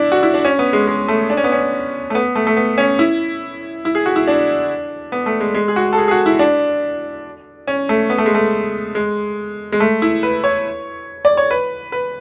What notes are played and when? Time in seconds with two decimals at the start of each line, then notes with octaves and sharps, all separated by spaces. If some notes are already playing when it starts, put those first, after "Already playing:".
Already playing: D4 E4
0.12 F#4
0.23 E4
0.34 D4
0.45 C#4
0.59 B3
0.73 G#3
0.87 G#3
1.08 A3
1.30 D4
1.37 C#4
1.44 B3
1.52 C#4
2.10 A3
2.15 B3
2.35 A3
2.47 A3
2.57 B3
2.78 C#4
2.99 E4
3.85 E4
3.95 G#4
4.06 F#4
4.16 E4
4.28 D4
5.12 B3
5.26 A3
5.40 G#3
5.55 G#3
5.68 G#4
5.76 F#4
5.93 A4
5.98 G#4
6.08 G#4
6.11 F#4
6.26 E4
6.39 D4
7.67 C#4
7.89 A3
8.10 B3
8.18 A3
8.26 G#3
8.34 A3
8.95 G#3
9.72 G#3
9.80 A3
10.02 E4
10.23 B4
10.44 C#5
11.25 D5
11.37 C#5
11.51 B4
11.92 B4